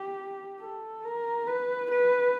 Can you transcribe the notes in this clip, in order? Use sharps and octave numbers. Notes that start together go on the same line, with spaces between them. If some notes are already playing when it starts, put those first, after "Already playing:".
Already playing: G4
A4
A#4
B4
B4